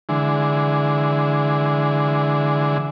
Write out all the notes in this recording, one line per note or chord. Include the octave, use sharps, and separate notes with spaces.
D3 E3 G#3